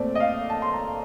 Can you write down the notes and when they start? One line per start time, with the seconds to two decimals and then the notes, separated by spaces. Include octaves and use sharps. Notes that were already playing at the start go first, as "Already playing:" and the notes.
Already playing: A#2 A3 C4 D5
0.15 D#5
0.20 F5
0.50 A5
0.62 C6
0.73 A#5